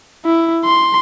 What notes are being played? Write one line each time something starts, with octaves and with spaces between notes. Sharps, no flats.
E4
C6